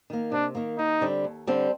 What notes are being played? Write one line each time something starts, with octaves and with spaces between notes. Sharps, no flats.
D#3 A#3
C3 D4
D#3 A#3
D#2 D#4
D3 G3 C4
D#2
D3 G3 C4